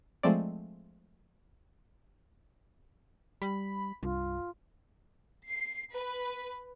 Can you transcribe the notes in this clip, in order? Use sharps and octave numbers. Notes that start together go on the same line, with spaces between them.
F3 G#3 A3 C4 D5
G3 B5
C2 G2 F4
C7
B4